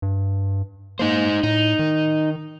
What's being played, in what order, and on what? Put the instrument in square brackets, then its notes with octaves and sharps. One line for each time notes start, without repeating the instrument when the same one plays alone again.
[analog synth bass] G2
[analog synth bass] A#3 [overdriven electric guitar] D#4 C5
[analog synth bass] A2 [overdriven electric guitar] D#4
[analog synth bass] D#3